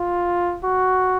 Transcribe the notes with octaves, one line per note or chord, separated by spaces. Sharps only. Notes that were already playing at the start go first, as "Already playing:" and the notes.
Already playing: F4
F#4